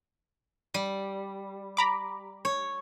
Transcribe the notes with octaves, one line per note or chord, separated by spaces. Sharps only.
G3
A#5 B5 D6
C#5